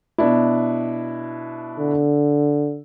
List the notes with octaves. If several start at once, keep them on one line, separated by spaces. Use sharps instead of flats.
B2 D4 E4
D3